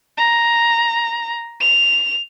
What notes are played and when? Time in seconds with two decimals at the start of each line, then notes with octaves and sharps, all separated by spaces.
0.17 A#5
1.60 F7